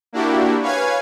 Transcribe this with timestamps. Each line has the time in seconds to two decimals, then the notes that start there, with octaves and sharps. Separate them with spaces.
0.13 A#3 D4 E4 F#4 G4
0.61 B4 C#5 F5 G#5 G#6